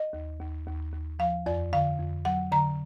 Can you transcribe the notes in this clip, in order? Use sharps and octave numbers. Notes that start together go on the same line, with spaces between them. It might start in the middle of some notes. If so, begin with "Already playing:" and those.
Already playing: D#5
D#2
D#2
D#2
D#2
F3 F5
F2 D5
D3 F5
F2
F#3 F#5
D3 A#5